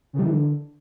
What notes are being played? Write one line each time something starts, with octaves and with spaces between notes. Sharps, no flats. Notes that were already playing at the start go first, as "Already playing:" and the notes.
C#3
G3
E3
D3